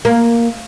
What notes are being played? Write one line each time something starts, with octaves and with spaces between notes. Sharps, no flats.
A#3